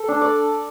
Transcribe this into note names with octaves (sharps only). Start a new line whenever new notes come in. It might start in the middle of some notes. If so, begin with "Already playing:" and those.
Already playing: A4
D4
D5